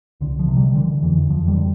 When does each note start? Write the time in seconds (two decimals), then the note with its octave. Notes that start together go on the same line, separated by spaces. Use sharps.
0.21 C2 D3
0.39 F3
0.48 C3
0.57 G3
0.75 D3 E3
1.03 F2 E3
1.30 F2 F3
1.48 G3
1.57 D3